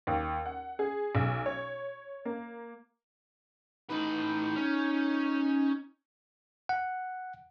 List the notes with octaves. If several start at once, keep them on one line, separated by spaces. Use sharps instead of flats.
D#2
F#5
G#4
B1
C#5
A#3
A2 D#4 B4
C#4
F#5